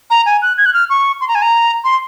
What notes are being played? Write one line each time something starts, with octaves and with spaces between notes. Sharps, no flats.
A#5
G#5
F#6
G#6
F#6
F6
C#6
C6
A#5
G#5
A#5
C6